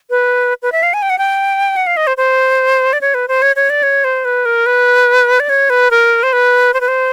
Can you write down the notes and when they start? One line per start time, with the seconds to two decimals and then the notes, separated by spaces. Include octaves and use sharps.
0.10 B4
0.62 B4
0.72 E5
0.83 F5
0.94 G#5
1.02 G5
1.10 F#5
1.18 G5
1.76 F#5
1.87 F5
1.97 D#5
2.07 C5
2.17 C5
2.93 D5
3.01 C#5
3.14 B4
3.28 C5
3.42 C#5
3.56 C#5
3.70 D5
3.83 C#5
4.04 C5
4.25 B4
4.45 A#4
4.66 B4
5.40 D5
5.49 C#5
5.70 B4
5.91 A#4
6.23 C5
6.33 B4
6.74 C5
6.81 B4
6.88 C5